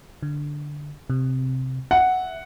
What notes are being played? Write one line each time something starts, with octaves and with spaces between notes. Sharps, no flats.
D3
C3
E5 F#5